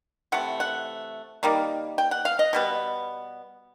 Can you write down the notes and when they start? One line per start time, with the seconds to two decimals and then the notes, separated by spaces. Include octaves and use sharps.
0.32 C3 E3 A3 F#5
0.60 F#5
1.43 D#3 G3 A#3
1.98 G5
2.11 F#5
2.25 F5
2.39 D#5
2.53 B2 G3 B3